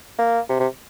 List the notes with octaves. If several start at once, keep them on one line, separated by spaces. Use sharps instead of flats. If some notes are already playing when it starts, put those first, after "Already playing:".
A#3
C3
C3